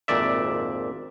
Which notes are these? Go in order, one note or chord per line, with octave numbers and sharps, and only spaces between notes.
G#1 F2 A#2 D5 E5